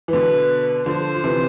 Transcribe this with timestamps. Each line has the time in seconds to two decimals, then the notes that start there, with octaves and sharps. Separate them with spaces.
0.08 E3
0.13 B2 D3 B4
0.86 D3 F3 C5
1.15 F3
1.24 C3 E3